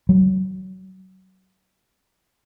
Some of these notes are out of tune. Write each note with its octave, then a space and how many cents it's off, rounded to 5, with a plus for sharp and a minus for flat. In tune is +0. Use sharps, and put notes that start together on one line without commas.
F#3 +25